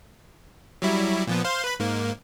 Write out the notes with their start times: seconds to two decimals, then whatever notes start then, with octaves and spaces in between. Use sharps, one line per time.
0.82 F#3 G3 E4
1.27 A#2 F3 B3
1.44 C5 F5 C6
1.64 B4 B5
1.80 G#2 A#3